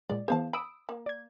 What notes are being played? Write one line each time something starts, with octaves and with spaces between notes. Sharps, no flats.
A#2 G#3 D5
E3 B3 G#4 C5 F5 A5
B5 D#6 E6 D7
A#3
D5 G#6